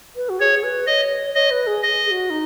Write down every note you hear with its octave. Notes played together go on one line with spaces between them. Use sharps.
B4
F#4
G#4 C#5
B4
C#5 D#5
C#5 D#5
B4
G#4
D#5
G#4
F#4
D#4